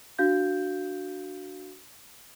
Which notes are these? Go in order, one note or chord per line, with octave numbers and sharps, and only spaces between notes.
D4 F#4 F5 G6